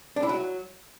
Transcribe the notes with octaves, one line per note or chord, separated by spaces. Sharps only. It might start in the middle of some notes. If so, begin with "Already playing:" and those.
D4
E4
F#3